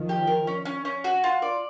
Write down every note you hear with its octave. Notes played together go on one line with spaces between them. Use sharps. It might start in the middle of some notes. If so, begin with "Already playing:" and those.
Already playing: D#3 F3
G4
A#4
C#4
C#4
C#4
F#4
F4
D5